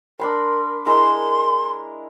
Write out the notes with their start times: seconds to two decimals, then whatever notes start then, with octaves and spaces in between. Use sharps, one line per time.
0.20 D4 A#4 B5 C6
0.86 G#3 E4 A#4 C6